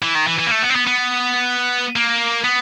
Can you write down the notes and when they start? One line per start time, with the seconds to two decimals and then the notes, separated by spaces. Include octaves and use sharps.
0.03 E3
0.15 D#3
0.27 E3
0.39 E3
0.46 A#3
0.51 A3
0.63 B3
0.70 C4
0.76 B3
0.87 B3
1.96 A#3
2.44 B3